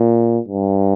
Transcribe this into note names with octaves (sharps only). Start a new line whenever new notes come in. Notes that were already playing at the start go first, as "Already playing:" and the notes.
Already playing: A#2
G2